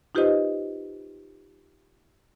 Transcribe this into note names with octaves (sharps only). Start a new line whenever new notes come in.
D#4 F4 G4 B4 C5 D#5